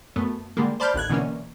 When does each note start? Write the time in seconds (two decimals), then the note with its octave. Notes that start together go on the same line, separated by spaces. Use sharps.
0.16 F#2 A3 B3
0.57 D3 G3 G#3 A#3
0.80 C5 D5 A5 B5 F6 G6
0.94 A1 D#2 F#6 G#6
1.10 B2 D3 E3 A#3 C#4